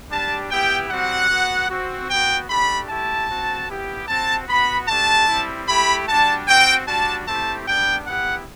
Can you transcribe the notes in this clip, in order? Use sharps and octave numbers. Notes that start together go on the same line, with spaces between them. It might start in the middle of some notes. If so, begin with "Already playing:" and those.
G3 D4 G4 A5
B3 E4 G4 G5
G3 C4 F#4 F#5
B3 F#4
C4 F#4
B3 F#4 G5
A3 D4 G4 B5
A3 E4 G4 A5
C4 F#4
B3 E4 G4
C4 F#4 A5
B3 F#4 B5
A3 D4 G4 A5
G3 C4 E4
A3 E4 G4 B5
G3 D4 F#4 A5
C4 F#4 G5
G3 D4 F#4 A5
A3 C4 E4 G4 A5
G3 B3 D4 G5
B3 E4 G4 F#5